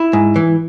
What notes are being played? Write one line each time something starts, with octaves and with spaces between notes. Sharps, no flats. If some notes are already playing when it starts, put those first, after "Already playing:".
Already playing: E4
G#2
E3